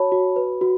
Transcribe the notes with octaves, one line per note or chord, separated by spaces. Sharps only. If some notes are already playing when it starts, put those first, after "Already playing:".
Already playing: F#4 C#5 A5 B5
F#4
B4
F#4